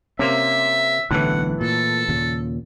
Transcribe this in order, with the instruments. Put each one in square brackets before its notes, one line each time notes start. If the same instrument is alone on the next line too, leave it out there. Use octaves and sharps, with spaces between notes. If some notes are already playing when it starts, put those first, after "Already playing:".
[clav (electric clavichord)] C3 A#3 C5 [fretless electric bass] C#4 [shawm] E5
[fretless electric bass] D1 B1 D3 [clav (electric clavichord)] A2 E3 [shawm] F#5
[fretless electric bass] A#2 [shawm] A4
[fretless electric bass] D#2 A#2 C#3